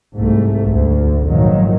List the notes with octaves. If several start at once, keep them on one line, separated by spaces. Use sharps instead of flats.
C2 G#2 A3
D2
G#1 A#2 D#3 F3 F#3